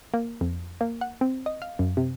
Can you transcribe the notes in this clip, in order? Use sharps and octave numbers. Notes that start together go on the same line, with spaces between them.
A#3
F2
A#3
F#5
C4
D#5
F5
F#2
C3